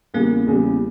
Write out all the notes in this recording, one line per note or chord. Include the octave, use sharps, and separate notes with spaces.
E2 C#3 G3 A#3
E2 C#3 G3